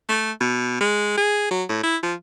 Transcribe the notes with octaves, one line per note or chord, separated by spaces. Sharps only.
A3
B2
G#3
G#4
F#3
A2
E4
F3